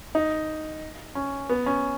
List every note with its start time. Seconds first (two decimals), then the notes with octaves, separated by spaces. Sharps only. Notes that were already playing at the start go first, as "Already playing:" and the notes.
0.15 D#4
1.15 C#4
1.49 B3
1.66 C#4